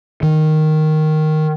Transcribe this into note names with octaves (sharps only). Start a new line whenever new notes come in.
D#3